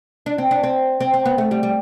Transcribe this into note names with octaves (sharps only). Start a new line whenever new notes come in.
D4
C4
D4
C4
C4
C4
B3
A3
G3
G3